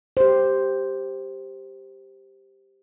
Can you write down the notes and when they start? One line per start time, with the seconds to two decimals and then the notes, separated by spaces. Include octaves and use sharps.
0.17 G4 C5